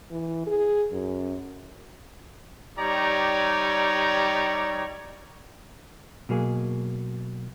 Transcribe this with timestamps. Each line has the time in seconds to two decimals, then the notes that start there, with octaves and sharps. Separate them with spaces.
0.11 E3
0.47 G#4
0.92 F#2
2.78 G3 D#4 G4 C#5 D5 A#5
6.29 B2 F#3 A#3 G#4